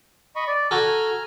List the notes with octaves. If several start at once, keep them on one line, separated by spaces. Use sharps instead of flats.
D#5 B5 C#6
D5
F#4 A4 G#5 A#5 F6